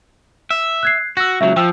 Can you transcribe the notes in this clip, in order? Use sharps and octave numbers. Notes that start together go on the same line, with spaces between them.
E5
F#6 G#6 C7
F#4 E6 A#6
C#2 F#3 E5
F3 G5 E6